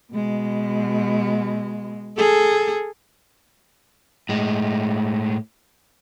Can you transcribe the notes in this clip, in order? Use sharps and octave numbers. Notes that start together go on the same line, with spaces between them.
B2 G#3
G#4 A4
A2 G#3